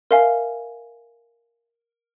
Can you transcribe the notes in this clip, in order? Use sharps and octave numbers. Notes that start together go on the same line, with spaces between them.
A#4 E5 F5 G#5